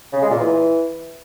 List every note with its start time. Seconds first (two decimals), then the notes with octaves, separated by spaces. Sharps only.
0.13 C#3
0.22 G#3
0.31 A#2
0.40 E3